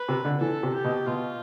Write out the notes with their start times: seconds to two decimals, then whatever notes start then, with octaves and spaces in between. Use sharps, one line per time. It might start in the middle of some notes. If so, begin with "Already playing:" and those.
Already playing: B4
0.08 C3
0.25 D3
0.40 E3 A4
0.63 C3
0.74 G4
0.84 B2
1.07 B2 F4